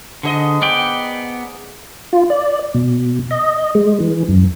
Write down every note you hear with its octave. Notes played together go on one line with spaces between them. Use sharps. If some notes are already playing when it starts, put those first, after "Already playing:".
G#2 D3 G4 D#5
B3 D5 G5
F4
D5
B2
D#5
G#3
E3
F#2